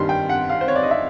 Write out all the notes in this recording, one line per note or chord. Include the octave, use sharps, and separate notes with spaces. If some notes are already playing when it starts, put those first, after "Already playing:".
Already playing: G2 D#3 G3 C6
G5
F#5
F5
C5
C#5
D5
D#5
E5